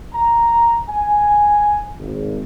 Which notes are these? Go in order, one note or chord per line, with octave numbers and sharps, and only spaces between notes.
A#5
G#5
G#1